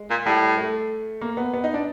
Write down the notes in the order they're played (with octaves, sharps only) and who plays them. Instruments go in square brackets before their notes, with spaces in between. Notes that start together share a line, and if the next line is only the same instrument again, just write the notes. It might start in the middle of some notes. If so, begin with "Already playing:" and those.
Already playing: [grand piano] G#3
[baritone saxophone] A#2
[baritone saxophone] A2 [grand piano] G3
[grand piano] A3
A#3
B3
B3
D#4
D4